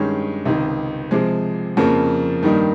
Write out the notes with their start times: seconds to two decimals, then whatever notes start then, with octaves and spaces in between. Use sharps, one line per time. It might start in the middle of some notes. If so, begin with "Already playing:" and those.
Already playing: G2 D#3 G#3 C#4
0.46 C#2 C3 D#3
1.11 C3 F3 G#3
1.77 F2 C#3 F3 A#3
2.43 G2 D#3 G3 A#3 D#4